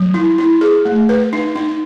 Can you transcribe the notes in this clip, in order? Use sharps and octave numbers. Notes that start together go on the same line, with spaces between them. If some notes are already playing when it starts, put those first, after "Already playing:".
Already playing: F#3
E4
E4
G#4
A3
B4
D#4
D#4